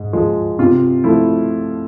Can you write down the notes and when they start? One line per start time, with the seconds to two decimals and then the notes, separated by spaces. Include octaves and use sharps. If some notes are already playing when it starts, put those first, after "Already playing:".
Already playing: G#2
0.13 F3 G#3
0.59 C3 F4
1.04 F3 A3 E4